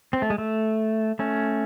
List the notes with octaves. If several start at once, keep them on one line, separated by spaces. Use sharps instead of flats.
C4
A3
G#3
A3
A3 C#4